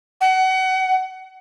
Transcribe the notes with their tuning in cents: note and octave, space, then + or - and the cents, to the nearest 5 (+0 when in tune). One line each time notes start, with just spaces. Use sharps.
F#5 +30